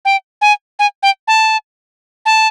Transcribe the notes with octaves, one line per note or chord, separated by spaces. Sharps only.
G5
G#5
G#5
G5
A5
A5